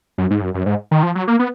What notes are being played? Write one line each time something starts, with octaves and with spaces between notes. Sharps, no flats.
F#2
G#2
F#2
F#2
G#2
D#3
F3
F#3
A#3
B3